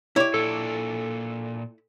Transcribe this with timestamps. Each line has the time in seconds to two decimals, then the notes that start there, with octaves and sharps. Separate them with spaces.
0.16 E4 G4 C#5 D5
0.34 A#2 D4 A4